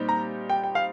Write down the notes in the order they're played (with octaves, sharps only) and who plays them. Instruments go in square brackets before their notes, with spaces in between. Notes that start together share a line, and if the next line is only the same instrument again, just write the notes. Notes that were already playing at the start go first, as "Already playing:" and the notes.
Already playing: [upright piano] A#2 G3 C4 D#4 G4
[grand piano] A#5
G5
G5
F5